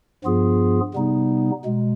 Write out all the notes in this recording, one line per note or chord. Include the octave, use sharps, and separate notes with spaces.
G2 F3 B3 F4 G#4
C3 G3 B3 D#4
B2 G#3